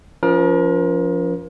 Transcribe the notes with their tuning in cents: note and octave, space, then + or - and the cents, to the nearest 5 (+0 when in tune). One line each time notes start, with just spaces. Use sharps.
F3 +0 C#4 +45 A#4 +35